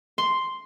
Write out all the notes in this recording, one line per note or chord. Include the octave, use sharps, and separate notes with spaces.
C6